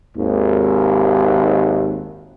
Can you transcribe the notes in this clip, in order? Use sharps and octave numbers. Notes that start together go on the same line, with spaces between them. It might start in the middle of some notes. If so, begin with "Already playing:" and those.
G#1 D#2